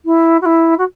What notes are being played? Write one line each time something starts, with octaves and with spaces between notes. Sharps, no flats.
E4
F#4
E4
F#4